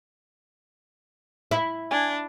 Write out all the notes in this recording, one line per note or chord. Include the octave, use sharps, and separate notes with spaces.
E4
D4 G#5